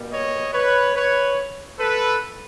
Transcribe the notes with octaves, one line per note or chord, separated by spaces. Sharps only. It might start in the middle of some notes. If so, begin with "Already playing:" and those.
Already playing: B2 G3 A#3
C#5 D#5
B4 C#5
B4 C#5
A4 B4